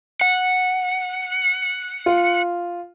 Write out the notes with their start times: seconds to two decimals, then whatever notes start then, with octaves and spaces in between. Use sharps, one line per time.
0.21 F#5
2.06 F4